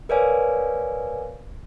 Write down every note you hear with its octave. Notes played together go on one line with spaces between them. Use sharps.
A#4 B4 C#5 D5 F5 G#5